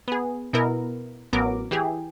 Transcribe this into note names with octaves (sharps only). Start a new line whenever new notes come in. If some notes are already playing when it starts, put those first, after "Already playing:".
B3 G#4
B2 B3 E4 A#4
A1 F#3 B3 A#4 D6
E3 G4 G#4